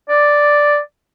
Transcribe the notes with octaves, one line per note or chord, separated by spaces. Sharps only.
D5